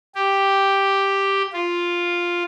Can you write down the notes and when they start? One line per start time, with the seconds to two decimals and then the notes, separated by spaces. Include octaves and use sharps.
0.15 G4
1.53 F4